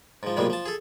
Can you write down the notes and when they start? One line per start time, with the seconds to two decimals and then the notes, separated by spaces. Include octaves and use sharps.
0.23 G#2 F3
0.37 B1 G2 A#2 F3 G3 G#3
0.50 F3 A5
0.66 G#4 A4